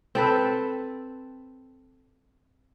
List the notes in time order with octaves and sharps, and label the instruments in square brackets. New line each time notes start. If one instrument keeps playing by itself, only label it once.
[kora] C4 A4 B4